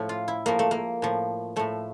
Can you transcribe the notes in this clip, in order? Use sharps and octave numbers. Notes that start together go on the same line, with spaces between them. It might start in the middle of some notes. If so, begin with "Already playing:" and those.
Already playing: A2 F3
F4
E4
A2 F3 A#3
A3
A#3
A2 F3
A2 F3 A3